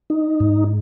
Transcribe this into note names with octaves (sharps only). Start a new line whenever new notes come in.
D#4
G#2